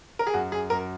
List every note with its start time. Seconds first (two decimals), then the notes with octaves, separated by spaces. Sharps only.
0.19 A#4
0.27 G#4
0.34 F#2 F#4
0.52 G#4
0.70 F#2 A#4